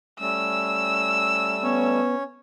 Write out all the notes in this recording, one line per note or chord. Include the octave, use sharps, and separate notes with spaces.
G3 A3 C#4 E6
B3 C#4 C#5